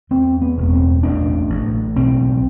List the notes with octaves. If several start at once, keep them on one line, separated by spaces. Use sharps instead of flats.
E2 C4
B3
E1
C4
A1 D4
A1
B1 C4